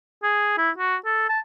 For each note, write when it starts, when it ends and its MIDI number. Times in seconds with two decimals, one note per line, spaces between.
0.23 0.55 68
0.58 0.70 64
0.78 0.96 66
1.05 1.25 69
1.29 1.39 81